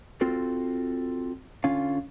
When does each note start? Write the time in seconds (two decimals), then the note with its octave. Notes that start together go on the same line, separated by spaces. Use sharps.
0.21 C4 F4 F#4 A4
1.64 D3 C#4 F4 F5